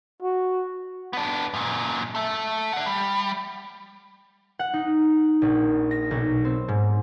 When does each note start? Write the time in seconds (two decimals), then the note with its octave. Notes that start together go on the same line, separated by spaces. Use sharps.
0.23 F#4
1.13 B3 D4
1.54 F#2 A#2
2.15 A4 E5
2.73 D5 F#5
2.86 G3
4.59 F#5
4.74 D#4
5.42 A#1
5.91 A#6
6.11 B1
6.45 C4
6.68 G#2